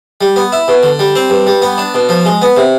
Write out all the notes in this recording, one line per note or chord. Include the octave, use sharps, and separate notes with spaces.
G3
B3
E4
B2
D3
G3
C4
G2
G3
B3
D4
B2
F3
G#3
B3
C3